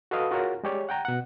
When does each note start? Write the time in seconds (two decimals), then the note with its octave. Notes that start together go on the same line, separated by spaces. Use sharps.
0.11 F#4 A4 B4 D#5 F5 D#6
0.31 F4 F#4 G#4 A#4 C#5 F#5
0.64 G#3 G4 C#5 D5
0.89 F#5 G5 A#5
1.05 B2 F#5